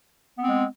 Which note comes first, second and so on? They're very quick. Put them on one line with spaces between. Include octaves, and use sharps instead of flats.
B3 C4 G#3